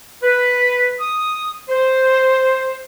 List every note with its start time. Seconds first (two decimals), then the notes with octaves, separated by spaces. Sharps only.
0.23 B4
0.99 D#6
1.70 C5